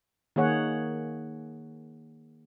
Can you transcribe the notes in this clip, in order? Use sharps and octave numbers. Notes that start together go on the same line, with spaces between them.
D#3 A#3 G#4 C#5 F#5